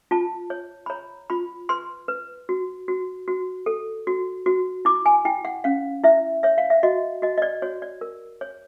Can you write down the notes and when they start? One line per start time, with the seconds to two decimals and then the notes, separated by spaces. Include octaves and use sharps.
0.11 F4 A5
0.50 C#5
0.86 B5
0.90 C#5 A#5
1.30 F4 B5
1.69 B4 C6
2.08 B4
2.49 F#4
2.88 F#4
3.28 F#4
3.66 A4
4.07 F#4
4.46 F#4
4.85 E4 D6
5.06 G#5
5.25 E4 G5
5.45 F#5
5.64 C#4 F5
6.04 E4 E5
6.43 C#5 E5
6.58 F5
6.70 E5
6.83 F#4 D#5
7.22 F#4 D#5
7.38 D#5
7.42 D5
7.62 F#4 C#5
7.82 D5
8.01 A#4
8.41 C#5